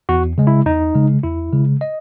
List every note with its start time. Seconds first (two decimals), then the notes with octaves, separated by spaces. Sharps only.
0.09 E2 F#4
0.38 C#3 G#3
0.47 E4
0.66 E2 D#4
0.95 C#3 G#3
1.23 E2 E4
1.52 C#3 G#3
1.81 D#5